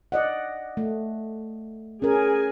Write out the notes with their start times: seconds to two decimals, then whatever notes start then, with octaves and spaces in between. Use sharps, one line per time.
0.12 D5 D#5 F#5
0.77 A3
2.02 C#4 G#4 A#4 G#5